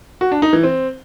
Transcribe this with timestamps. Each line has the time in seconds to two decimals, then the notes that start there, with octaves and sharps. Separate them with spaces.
0.21 F#4
0.32 D4
0.42 D#4
0.53 E3
0.63 C4